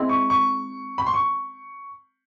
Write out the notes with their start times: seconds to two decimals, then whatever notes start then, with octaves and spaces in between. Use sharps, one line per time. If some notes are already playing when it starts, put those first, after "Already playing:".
Already playing: G#3 C4 E4
0.09 C#6
0.30 C#6
0.98 B5
1.06 C6
1.14 C#6